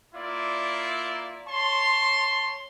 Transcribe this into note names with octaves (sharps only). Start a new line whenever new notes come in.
A#3 E4 F4 D5
C#5 A5 C6